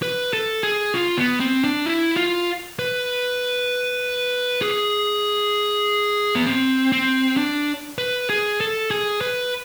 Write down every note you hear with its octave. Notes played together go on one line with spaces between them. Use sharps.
B4
A4
G#4
F4
B3
C4
D4
E4
F4
B4
G#4
B3
C4
C4
D4
B4
G#4
A4
G#4
B4